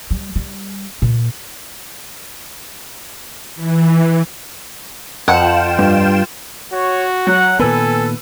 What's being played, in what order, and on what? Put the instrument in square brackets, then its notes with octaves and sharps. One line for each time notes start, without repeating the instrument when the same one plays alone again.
[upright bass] G3
G3
A#2
[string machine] E3
[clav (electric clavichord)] F2 [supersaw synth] F4 G5 E7 [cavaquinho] F#5
[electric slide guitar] G2
[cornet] F#4 [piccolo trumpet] C#5
[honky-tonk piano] F#3 [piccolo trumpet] F#5
[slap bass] A#2 D#3 B3 [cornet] A4 [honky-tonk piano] B4 E6 [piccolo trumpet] G#5